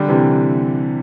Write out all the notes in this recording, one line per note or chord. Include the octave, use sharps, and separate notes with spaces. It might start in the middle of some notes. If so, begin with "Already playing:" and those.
Already playing: D3 G3
C3 E3